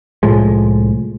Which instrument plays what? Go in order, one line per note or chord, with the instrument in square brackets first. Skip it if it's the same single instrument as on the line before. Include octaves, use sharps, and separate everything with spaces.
[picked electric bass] C2 A2 F3 G#3